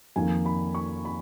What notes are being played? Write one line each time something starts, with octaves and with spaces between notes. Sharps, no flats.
F2 D#3 A#3 G#5
B5
C#6
B5